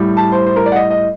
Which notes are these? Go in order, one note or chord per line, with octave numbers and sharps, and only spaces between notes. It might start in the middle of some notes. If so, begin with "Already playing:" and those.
Already playing: A2 G3
A5
C5
C5
A#4
D5
F#5
D#5
D#5